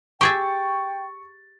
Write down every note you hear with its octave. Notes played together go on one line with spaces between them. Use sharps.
G4 G#4 E5 G5 C#6 A6